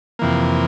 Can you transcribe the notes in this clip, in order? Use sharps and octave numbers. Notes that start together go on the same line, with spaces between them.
F2 C3 E3 A#3